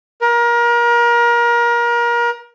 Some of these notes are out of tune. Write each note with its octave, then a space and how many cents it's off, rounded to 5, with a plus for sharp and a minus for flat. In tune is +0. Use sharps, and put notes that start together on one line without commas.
A#4 +30